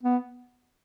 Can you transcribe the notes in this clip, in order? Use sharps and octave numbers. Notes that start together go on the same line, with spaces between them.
B3